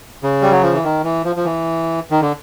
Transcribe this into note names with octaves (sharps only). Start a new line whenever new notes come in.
C#3
G3
F#3
F3
E3
D#3
E3
F3
F3
E3
D#3
D3